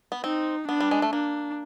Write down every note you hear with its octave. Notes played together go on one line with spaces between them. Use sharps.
B3
C4 D#4
B3 D4
G3
G#3
A3
A#3 D4